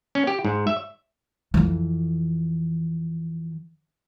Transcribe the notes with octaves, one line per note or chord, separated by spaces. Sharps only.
C#4
G4
G#2
E5
F2 E3